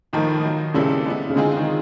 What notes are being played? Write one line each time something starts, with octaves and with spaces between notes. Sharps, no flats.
A2 D#3 F3 A#3 D#4
F#3 A#3 D#4
A#2 C#3 G3 C4 E4 A4
G#3 B3 E4
C#3
D3 G#3 C4 F4 G#4
D#3